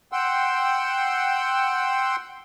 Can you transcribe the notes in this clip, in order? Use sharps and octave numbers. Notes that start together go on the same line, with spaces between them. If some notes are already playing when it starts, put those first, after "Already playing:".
F#5 G5 C6 E6